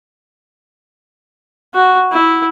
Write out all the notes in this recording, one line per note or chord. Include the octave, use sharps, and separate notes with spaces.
F#4
E4